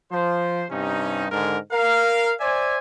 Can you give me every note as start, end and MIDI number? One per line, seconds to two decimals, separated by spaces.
0.12 0.64 53
0.12 0.64 72
0.71 1.26 43
0.71 1.26 48
0.71 1.26 61
0.71 1.26 63
1.32 1.57 44
1.32 1.57 50
1.32 1.57 51
1.32 1.57 56
1.32 1.57 70
1.72 2.33 70
1.72 2.33 77
2.40 2.78 72
2.40 2.78 74
2.40 2.78 76
2.40 2.78 80